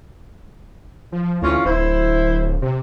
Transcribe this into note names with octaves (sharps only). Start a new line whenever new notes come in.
F3
D2 E3 C#4 F4
D1 E4 C5
C3